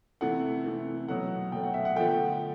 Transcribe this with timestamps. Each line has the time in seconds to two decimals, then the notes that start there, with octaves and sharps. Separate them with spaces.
0.21 C3 E3 A3 F#5
0.65 C3 E3 A3
1.08 B2 F#3 A3 F#5
1.52 B2 F#3 A3 G5
1.63 F#5
1.74 E5
1.85 F#5
1.96 D3 F3 A3 G5